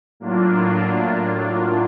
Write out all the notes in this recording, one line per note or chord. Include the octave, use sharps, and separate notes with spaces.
A2 F#3 A#3 D4 F4